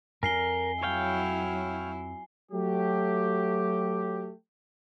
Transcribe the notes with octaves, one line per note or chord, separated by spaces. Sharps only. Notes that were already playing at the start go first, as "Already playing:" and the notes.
F2 A#4 G#5 C7 G7
F#3 E4 C#5 F5 G5
F#3 A3 G4